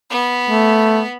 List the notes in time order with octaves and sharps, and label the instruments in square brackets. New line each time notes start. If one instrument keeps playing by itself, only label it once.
[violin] B3 B5
[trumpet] A3